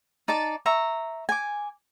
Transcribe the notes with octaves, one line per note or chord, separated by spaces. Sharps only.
D#4 D5 A5 D6
E5 A#5 C#6
G#5 D6